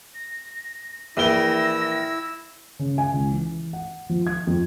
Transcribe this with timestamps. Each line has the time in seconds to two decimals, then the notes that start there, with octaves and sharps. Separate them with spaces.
0.15 A#6
1.17 A#1 E3 E4 A#4 E6 A#6 G7
2.79 C#3
2.98 G#5
3.14 C#2
3.31 E3
3.73 F#5
4.09 F3
4.27 G#6
4.47 F2